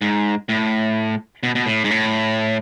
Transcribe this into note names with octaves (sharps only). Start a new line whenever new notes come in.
G#2
A2
B2
B2
A2
G#2
A2